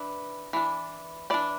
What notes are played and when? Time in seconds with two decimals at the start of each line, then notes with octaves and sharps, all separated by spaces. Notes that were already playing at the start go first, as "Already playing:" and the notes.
Already playing: E3 D4 B4
0.53 E3 D4
1.30 E3 D4 D5